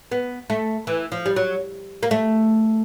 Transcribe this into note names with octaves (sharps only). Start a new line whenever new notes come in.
B3
A3
E3
F3
G3
F#3
A#3
A3